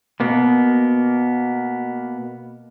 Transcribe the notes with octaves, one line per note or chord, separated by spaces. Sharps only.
B2 A#3 B3